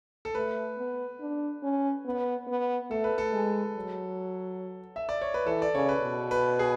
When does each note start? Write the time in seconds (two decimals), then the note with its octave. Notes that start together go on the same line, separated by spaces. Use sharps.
0.25 A4
0.35 A3 B4
0.78 B3
1.21 D4
1.63 C#4
2.06 B3
2.48 B3
2.90 A3 A4
3.04 B4
3.18 A4
3.33 G#3
3.76 F#3
4.96 E5
5.09 D5
5.21 C#5
5.34 B4
5.46 E3 A4
5.62 D5
5.74 C#3 C#5
5.89 B4
6.03 B2
6.31 B4
6.59 G#4